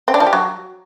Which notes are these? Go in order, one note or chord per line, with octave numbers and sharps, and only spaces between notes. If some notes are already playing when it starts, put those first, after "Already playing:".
C4
D4
F3
G4
F#3